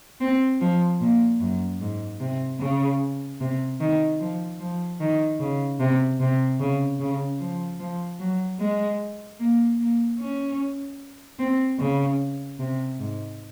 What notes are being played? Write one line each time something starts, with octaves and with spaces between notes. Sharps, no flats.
C4
F3
A#2
F#2
G#2
C3
C#3
C3
D#3
F3
F3
D#3
C#3
C3
C3
C#3
C#3
F3
F3
F#3
G#3
A#3
A#3
C#4
C4
C#3
C3
G#2